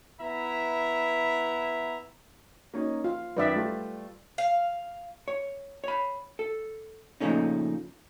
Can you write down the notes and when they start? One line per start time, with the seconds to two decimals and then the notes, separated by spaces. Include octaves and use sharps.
0.21 B3 E4 E5 A#5
2.74 A#3 C#4 D#4
3.04 F4 F5
3.37 F#2 D#3 B4 D5 E5 D#6
3.55 G3 A3 F4
4.38 F5
5.28 C#5
5.84 C#5 B5
6.39 A4
7.20 A#2 C#3 F3 A3 C#4 D#4